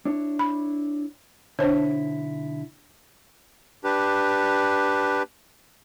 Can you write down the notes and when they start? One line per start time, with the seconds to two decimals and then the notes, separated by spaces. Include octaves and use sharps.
0.05 D4 E4 C#5
0.39 B5
1.59 B1 D3 D4 E4 C5 C#5
3.84 D4 G4 B4